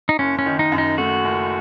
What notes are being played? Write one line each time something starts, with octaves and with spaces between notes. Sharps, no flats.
D#4
F#1 C#4
C#4
D#3
D#4
F#2
D#4
A3 F#4
F#1